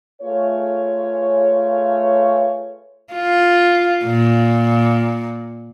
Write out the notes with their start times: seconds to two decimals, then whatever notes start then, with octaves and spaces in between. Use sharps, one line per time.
0.22 A3 F4 G#4 B4 C#5
3.13 F4
4.05 A#2